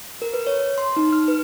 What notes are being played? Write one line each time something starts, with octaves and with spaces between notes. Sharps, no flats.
A#4
B4
C#5
C6
D#4
F6
B4